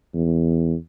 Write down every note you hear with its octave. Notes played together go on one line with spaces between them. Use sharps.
E2